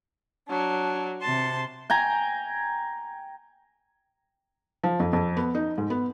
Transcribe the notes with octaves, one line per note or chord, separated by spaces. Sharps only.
F#3 D4
C3 A5 C6
G5 G#5 A#5
F3
F2
F2
B3
D#4
G#2
B3